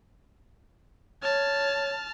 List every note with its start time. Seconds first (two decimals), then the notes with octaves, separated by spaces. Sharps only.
1.23 C#5 A5 F6